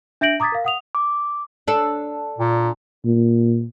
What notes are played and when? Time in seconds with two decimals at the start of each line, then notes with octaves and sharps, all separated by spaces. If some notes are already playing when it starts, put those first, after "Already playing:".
0.21 D4 E5 G6 A#6 D7 F#7
0.40 A#5 D6 D#6 G#6 A6 B6
0.52 A#4 F5
0.65 F#5 D#6 F7
0.95 D6
1.68 D4 A4
2.38 A#2
3.05 A#2